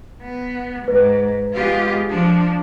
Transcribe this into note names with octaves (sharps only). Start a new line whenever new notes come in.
B3
G#2 B4
G#3 B3 F4 G4
F3 D4